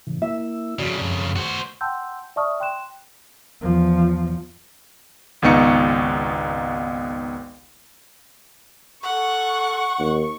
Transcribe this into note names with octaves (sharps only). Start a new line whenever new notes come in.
A2 C#3 E3
A#3 E4 E5 E6
F2 C#3 F#4 D5 B5
F#2
F#4 C5
F#5 G5 A5 C6 E6 G6
D5 E5 A5 C#6 D#6 F6
G5 C6 F#6 E7
E2 F3
G#1 C#2 B3 D#4 C#6 C#7
A4 F#5 C#6
D#2